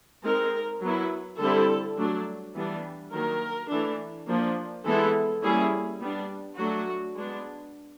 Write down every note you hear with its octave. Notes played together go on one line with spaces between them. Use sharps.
G#3 C4 D#4 A#4
F#3 B3 E4
D3 G3 C4 E4 A4
F#3 A3 D4
E3 G3 B3 D4
D#3 F#3 A#3 A#4
E3 A3 D4
F3 A#3 D4
E3 G#3 B3 E4 A4
G3 A#3 C#4 E4 G#4
G3 B3 D4
F#3 A3 D4 F#4
G#3 B3 D4